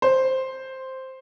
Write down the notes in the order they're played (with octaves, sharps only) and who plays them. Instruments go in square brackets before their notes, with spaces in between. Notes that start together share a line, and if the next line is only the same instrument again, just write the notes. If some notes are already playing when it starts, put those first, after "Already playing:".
[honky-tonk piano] C5